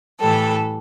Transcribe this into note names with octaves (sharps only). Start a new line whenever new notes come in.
A2 E3 G3 A4